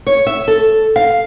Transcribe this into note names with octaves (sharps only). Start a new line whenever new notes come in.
C#5
E5
A4
F5